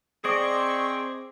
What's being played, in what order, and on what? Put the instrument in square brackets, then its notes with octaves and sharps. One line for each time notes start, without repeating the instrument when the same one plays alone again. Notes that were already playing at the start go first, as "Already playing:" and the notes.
[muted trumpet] C4 [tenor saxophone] G#4 [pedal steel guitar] C5 D5 D#5 [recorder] C#6